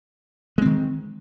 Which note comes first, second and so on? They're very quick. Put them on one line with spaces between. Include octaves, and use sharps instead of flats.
G#3 C4 D#3